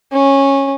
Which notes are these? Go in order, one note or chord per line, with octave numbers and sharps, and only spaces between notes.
C#4